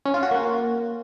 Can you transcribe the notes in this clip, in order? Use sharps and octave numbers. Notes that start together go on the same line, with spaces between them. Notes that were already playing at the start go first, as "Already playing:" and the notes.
C#4
F4
F#4
A#3